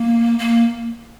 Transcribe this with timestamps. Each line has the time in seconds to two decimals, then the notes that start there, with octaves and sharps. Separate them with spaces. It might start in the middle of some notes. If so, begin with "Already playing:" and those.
Already playing: A#3
0.39 A#3